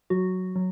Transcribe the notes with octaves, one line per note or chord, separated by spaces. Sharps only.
F#3 F#4
F#3